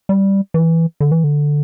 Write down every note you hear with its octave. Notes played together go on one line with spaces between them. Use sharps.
G3
E3
D3
E3
D3